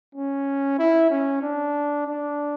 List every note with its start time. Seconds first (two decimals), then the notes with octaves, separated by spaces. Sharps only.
0.15 C#4
0.79 E4
1.10 C#4
1.42 D4
2.07 D4